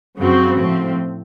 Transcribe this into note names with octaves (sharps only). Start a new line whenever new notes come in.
F#2 C#3 F3 C4 F#4
A2 F3 C4